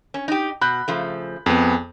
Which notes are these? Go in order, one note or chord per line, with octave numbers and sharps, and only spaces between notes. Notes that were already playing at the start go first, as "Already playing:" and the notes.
C#4
D#4 G4
B2 B5 F#6 G6
C#3 F3 A3
F2 B3 G#4